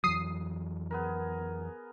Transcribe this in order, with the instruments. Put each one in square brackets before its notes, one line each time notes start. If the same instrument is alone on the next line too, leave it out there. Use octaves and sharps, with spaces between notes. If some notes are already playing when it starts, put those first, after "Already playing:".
[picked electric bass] F2 E3 F#3 [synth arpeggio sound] D#6 C7
[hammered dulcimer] B3 G#4 A#4